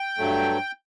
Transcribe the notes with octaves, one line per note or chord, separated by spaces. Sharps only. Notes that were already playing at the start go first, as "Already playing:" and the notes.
Already playing: G5
G2 F#3 A3